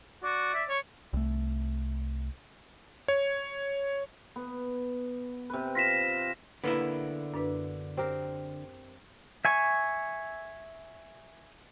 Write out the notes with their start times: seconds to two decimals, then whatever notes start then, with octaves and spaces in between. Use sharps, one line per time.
0.23 F#4 D5
0.54 E5
0.69 C#5
1.13 C2 A3
3.08 C#5
4.36 B3
5.50 C3 B4
5.75 F4 A#6 B6 E7
6.64 D3 A#3 B3 E4 B4
7.34 F#2 D4 B4
7.97 C4 G4 A#4
9.45 E5 G#5 C#6